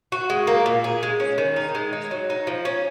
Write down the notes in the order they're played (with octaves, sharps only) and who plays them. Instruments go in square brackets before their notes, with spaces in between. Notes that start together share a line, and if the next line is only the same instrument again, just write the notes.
[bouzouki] F#4
G#3
A#3
A#2
G#4
G#3
C#4
D#3
D#4
G#3
D#4
F#3
D#4
F3
C#4